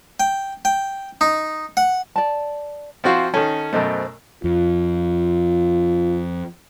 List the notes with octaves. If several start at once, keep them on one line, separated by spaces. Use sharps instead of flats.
G5
G5
D#4
F#5
D5 A5
F3 C4 E4 F#4 E5 F5
D#3 C#4 A4
F#2 B2 A3 C5 D#5
F2 F4